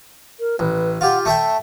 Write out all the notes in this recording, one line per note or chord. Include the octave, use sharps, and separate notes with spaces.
A#4
A1 B4
F4 G4 F#5
A3 E5 G5 A5